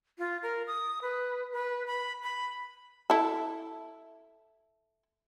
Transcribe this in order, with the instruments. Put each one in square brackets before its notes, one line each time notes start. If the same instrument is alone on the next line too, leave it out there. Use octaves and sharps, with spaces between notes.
[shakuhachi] F4
A#4
D#6
B4
B4
B5
B5
[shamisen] E4 A4